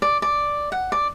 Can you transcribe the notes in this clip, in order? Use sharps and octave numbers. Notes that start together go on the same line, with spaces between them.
D5
D5
F#5
D5